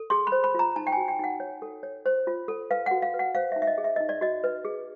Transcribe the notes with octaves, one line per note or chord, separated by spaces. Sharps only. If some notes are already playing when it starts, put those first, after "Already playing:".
Already playing: A4
G#4 C6
B5
C5
B5
F4 A#5
D#4 A5
G5
F#4 G#5
G5
D#4 F#5
C#5
A4
C#5
C5
F4
A4
B4 F5
F#4 F#5
F5
B4
F#5
C5 F5
E5
D#4
E5
D#5
G#4
E5
D#4 D#5
D5
F#4 D#5
B4
G#4